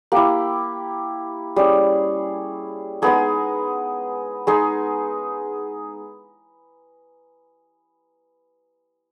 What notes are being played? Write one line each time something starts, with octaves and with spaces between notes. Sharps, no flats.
A#3 E4 G4
G3 C#4 E4 G#4
G#3 B3 D#4 G#4
G#3 D#4 G#4